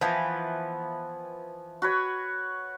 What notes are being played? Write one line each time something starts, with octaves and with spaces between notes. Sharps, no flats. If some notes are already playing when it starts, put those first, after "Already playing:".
E3 F3 B3
F#4 B4 C#5